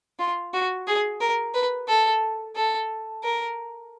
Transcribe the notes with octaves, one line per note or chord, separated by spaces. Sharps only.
F4
F#4
G#4
A#4
B4
A4
A4
A#4